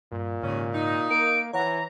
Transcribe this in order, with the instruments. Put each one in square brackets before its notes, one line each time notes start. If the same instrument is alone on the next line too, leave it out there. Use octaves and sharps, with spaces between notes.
[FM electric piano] G2 [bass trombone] A#2
[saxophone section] D#2 C#4 [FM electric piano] G#2 C#3
[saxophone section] D#4
[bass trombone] A#3 [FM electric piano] A#4 [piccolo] D7
[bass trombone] E3 [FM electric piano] C#5 F#5 [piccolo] A#5